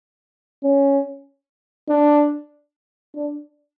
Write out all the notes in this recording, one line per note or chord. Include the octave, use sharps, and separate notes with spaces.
C#4
D4
D4